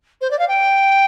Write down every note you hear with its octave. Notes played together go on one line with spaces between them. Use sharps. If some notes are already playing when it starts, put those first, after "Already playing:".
C5
D5
F5
G5